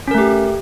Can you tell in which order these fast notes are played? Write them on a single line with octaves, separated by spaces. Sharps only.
C#4 A#4 A3 G4